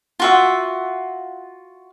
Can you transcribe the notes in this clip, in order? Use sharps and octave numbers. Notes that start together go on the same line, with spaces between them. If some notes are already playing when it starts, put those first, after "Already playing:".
F4 F#4 E5